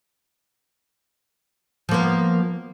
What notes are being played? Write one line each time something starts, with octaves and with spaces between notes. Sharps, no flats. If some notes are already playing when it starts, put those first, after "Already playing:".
F3 A#3 B3